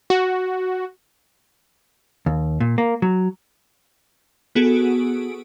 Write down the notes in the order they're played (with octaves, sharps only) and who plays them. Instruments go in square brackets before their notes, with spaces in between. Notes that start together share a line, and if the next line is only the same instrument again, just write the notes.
[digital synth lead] F#4
[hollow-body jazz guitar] D#2
A#2
A#3
F#3
[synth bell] B3 F#4 G#4 A4 D7